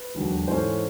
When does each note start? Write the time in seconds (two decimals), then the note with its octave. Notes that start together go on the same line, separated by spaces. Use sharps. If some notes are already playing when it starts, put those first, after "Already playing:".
Already playing: B4
0.15 E1 D#2 D3 F#3
0.47 G#2 E3 A3 C#4 C5